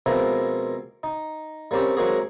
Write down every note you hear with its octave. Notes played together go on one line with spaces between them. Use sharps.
B2 F3 G#3 A#3 C4 E4
D#4
G3 A#3 C4 C#4 G4
F#3 G#3 A#3 C4 F#4 G#4